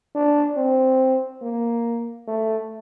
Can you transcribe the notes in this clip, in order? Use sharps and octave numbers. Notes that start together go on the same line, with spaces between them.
D4
C4
A#3
A3